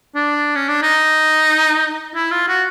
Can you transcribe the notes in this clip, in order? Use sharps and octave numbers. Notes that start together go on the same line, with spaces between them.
D4
C#4
D4
D#4
E4
F4
F#4